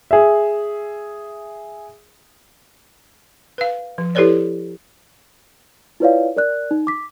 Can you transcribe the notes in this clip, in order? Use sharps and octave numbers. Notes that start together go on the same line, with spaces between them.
G#4 E5
B4 F5
F3
E4 G4 A4 B4 C#5 D5
E4 F4 B4 C#5 D5 F5
A#4 D5 F#6
D#4
D6 B6